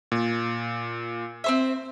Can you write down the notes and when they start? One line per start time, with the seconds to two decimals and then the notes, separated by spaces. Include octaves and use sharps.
0.12 A#2
1.44 C4 C5 E5